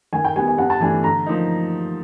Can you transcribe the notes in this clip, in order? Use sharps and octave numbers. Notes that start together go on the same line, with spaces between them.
D#3 G#5
G5
G3 B3 G#5
G#5
G2 F#5
A5
E3 A3 D4 G#5
D3 A#5
F3 A#3 D#4